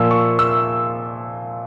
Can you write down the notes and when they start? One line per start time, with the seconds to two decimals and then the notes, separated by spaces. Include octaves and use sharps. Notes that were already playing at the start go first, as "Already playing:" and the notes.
Already playing: A#2 F3 A#3 E6
0.11 C#6
0.39 E6